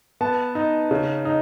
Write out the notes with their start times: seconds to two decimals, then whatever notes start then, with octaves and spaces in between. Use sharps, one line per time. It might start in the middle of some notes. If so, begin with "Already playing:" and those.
0.21 B3 A5
0.55 D#4
0.91 C#3
1.25 D#4